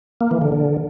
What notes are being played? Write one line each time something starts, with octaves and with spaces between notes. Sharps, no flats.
A#3
E3
D3
D3